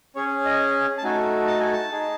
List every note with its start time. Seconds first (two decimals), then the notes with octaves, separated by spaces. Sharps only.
0.16 C#4 G#4 C#5
0.45 D#5
0.98 A5
1.04 A3 D#4 F#4 A4 G#5
1.47 A5
1.60 G#5
1.72 A5
1.92 D#4 G#4